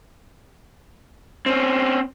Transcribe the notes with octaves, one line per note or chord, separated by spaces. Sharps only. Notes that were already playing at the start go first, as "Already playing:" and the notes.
C4 C#4